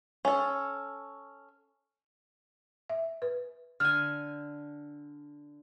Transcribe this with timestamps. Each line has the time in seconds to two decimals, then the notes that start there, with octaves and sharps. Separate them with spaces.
0.25 C#4 A4
2.89 E5
3.22 B4
3.80 D3 G#5 F6